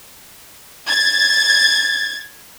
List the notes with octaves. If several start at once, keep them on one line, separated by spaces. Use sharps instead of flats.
G#6 A6